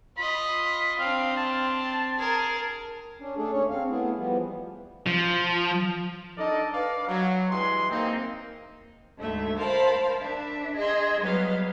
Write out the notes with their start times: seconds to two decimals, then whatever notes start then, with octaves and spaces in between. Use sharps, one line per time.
0.17 F4 D#5 B5
0.66 B5
0.99 C4 D4 F5
1.37 A5
2.19 G#4 A#4 A5
3.20 C#4 D4
3.37 A3 D4 G#4 A4
3.52 D#2 C#4 C#5
3.70 C4 F5
3.89 A3 B3 E4 G#4
4.17 E3 F3 G3 B3
5.06 F3
6.37 D4 D#4 A4 A#4 D5 D#5
6.73 D4 B4 D5 F5
7.07 F#3
7.50 G2 E3 G3 G#3 C6
7.89 A#3 C4 D#4
9.19 D2 G#2 A3 E5
9.57 A#4 C5 F5 A5 B5
10.20 D4 E5
10.76 G#4 D#5 G#5 C6 E6
11.21 F#3 G3 B3 B4 D#5 F5